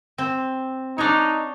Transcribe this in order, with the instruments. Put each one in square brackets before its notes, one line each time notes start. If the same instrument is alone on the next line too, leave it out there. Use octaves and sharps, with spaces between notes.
[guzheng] C4
[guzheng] D4 C#5 [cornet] D#4